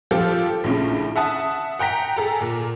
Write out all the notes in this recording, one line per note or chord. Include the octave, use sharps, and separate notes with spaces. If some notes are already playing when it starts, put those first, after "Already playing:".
F3 F4 G4 A4
A#1 A2 C#3
E5 F#5 A5 D#6
F#5 G5 A#5 B6
G#4 A4 A#5
A#2